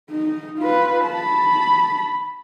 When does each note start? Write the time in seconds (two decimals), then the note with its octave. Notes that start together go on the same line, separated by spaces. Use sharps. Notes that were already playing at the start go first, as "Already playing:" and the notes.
0.10 D#4
0.59 F4 B4
1.06 A5 B5